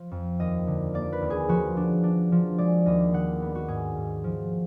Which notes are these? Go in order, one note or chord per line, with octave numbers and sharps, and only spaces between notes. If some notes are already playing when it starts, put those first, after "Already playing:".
Already playing: F3
F2
D#2 D#5
D3
A#3 D5
B4
D#2
G#4
F3 F#4
D4
D4
F3
G#3 D5
D#2 D#5
D#3 F#5
B3
F#4
G#2 G#4
G#2
F3